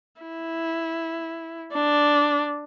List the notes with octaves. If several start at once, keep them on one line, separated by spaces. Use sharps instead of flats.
E4
D4